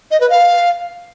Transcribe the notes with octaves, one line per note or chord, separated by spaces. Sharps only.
D#5
B4
F5